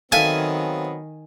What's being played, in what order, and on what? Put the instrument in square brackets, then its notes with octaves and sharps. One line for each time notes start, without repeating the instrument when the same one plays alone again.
[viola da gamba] D#3 [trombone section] F#3 B3 C4 [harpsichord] A4 E5 F5 [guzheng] G#5